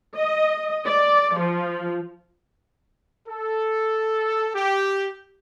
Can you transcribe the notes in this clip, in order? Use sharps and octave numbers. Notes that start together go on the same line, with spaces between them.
D#5
D5
F3
A4
G4